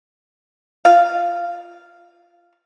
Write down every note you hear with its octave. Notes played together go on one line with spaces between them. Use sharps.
F4 F5